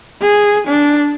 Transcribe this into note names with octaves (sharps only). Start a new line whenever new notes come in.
G#4
D4